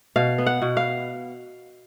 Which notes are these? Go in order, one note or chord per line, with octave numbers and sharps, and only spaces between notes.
B2 F5
B3
F#5
B2
F5